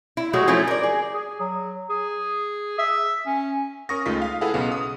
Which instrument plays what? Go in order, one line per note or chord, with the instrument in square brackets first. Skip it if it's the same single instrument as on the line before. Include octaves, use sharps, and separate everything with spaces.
[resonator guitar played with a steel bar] E4
F#3 G#3 A3 F#4
F3 F#3 A3 C#4 E4
A#4 D5
G#4
[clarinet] G#4
F#3
G#4
E5
C#4
[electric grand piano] C#4 A#4 C#6 D#6 A#6
C#2 G#3 A3 D#4 F4 B6
F5
E4 G#4 A4 B4 F5 F#5
B1 C#3 B3
D#6